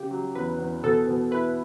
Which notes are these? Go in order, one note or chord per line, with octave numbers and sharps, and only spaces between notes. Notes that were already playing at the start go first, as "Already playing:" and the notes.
Already playing: C#3 G4
F#3
E2 B4
E2
B2 A4
B2
E4 B4